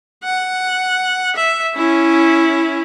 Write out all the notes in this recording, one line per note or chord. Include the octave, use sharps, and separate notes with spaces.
F#5
E5
C#4 E4